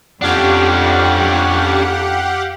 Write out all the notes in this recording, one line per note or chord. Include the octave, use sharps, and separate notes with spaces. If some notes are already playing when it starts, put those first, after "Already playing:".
F2 C#4 D4 G4 F5 F#5